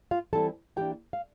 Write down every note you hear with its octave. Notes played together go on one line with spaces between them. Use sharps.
F4 F5
E3 G3 C4 E4 A4 A5
E3 A#3 D4 G4 G5
F5